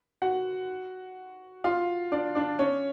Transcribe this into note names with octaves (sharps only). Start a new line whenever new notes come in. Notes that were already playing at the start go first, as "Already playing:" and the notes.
F#4 F#5
F4 F5
D4 D5
D4 D5
C#4 C#5